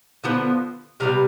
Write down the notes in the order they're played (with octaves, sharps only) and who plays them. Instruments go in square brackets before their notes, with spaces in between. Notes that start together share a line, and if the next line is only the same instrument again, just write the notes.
[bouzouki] D3 F3 B3
C3 G3 B3 F5